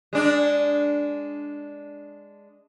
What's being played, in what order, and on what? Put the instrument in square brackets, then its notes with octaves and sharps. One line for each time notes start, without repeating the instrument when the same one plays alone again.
[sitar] G#3 D4